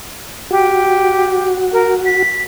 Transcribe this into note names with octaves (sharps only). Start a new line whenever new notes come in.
F#4 G4
A#4
B6